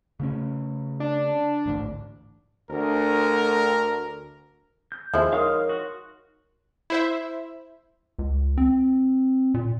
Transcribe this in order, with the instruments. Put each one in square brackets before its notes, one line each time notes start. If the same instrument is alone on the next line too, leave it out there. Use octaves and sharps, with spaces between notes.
[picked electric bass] C#3 A3 C#4
[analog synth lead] D4
[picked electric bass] A1 D2 G#2
[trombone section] D2 [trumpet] A#4
[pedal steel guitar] G6
[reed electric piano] D#2 C5 G#5 [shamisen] F3 G#3 E4
[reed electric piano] D#4 C#5 C6 [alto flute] A#4 [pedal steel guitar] F5 D#6 F6
[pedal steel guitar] F#4
[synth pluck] E4 C5 E5
[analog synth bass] C#2
C4
A#2